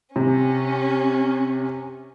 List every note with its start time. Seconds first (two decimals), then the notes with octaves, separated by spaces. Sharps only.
0.16 C3 C#4